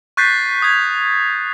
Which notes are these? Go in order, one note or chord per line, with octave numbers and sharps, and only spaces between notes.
C#6 F#6 G6 A6 B6 C7
D#6 G#6